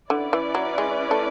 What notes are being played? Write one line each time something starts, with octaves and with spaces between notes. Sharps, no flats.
D3 C#4 E4 B4 D5
E3
F#3
G#3
A3